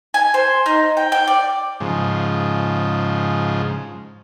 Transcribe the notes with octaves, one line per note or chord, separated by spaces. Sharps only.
G#5
C5
D#4
G5
G5
D5
G#2 C#3 F3